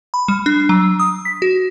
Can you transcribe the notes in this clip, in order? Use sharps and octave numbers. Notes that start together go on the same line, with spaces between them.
B5
G3
D4
F#3
D#6
B6
F#4